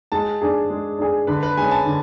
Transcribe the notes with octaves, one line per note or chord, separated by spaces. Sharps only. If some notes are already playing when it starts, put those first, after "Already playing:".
G#3 A5
D4 G#4
G#3
D4 G#4
D3 B4
B4
G#3 C#4 G#5
A5
D3